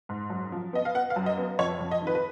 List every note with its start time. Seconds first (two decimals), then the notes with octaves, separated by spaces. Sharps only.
0.09 G#2
0.30 F#2
0.52 F3
0.73 B3 D#5
0.85 F5
0.95 B3 F#5
1.10 F5
1.16 F#2
1.26 D#5
1.38 B3
1.59 F2 C#5
1.80 F2
1.91 D#5
2.02 D#3 B4
2.15 B4